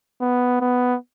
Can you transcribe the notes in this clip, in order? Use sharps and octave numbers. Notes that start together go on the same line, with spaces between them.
B3
B3